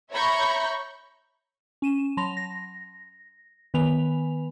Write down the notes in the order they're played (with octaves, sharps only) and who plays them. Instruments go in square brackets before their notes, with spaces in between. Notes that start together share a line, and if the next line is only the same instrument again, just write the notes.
[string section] C#5 E5 A#5 B5 C#6 G6
[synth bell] C#4 D#7 E7
F#3 A5 B5 C6 A#6 F7
A#6
D#3 B3 B4 G#5 B5 F7